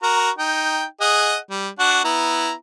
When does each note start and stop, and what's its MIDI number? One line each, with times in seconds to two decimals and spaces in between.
0.03 0.30 66
0.03 0.30 70
0.03 0.30 82
0.38 0.84 63
0.38 0.84 79
1.01 1.37 68
1.01 1.37 75
1.01 1.37 78
1.50 1.69 55
1.79 2.02 62
1.79 2.02 66
1.79 2.02 78
2.04 2.52 59
2.04 2.52 64
2.04 2.52 82